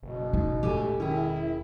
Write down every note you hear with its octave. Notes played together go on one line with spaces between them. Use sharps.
F#1 B2
D#4
E1 A2 G4 A4 G#5
D#3 C#4 E4 G#4